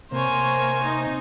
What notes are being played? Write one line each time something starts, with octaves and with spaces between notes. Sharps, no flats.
C3 A#3 C5 C#5 G#5
D#4